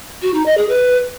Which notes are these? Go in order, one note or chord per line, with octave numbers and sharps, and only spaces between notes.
F#4
D#4
D#5
G#4
B4